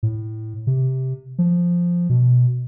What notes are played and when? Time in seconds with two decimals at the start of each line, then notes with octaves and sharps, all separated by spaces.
0.03 A2
0.67 C3
1.39 F3
2.10 B2